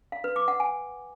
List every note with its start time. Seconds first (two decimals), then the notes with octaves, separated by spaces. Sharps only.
0.12 F5
0.24 B4
0.36 D6
0.48 F#5
0.60 G#5